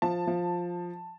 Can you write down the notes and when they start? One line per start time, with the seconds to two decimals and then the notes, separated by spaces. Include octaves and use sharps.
0.02 F3 A5
0.27 F3